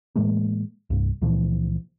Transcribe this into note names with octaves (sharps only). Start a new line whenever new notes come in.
A2 E3 G#3 A#3
C2 G2
C#2 A#2 E3 F3